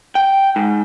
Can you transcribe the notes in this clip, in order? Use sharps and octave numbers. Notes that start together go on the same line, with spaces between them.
G5
G#2